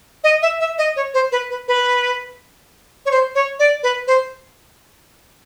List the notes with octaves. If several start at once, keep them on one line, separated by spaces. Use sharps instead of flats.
D#5
E5
E5
D#5
C#5
C5
B4
B4
B4
C#5
C5
C#5
D5
B4
C5